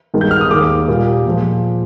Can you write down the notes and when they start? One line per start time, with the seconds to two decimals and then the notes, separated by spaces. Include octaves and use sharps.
0.14 G2 D#3 G#3
0.21 G6
0.31 F6
0.41 D#6
0.51 D#2 D#3 G#3 D6
0.88 A#2 G3 A#3
1.26 A#2 F3 G#3